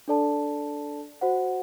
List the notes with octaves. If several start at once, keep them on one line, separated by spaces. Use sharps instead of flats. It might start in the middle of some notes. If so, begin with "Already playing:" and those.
D4 A4 D5 A5
F#4 C5 F#5